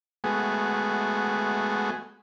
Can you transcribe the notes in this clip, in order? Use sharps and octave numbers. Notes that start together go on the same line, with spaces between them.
G#3 A3 B3 F#4 G#4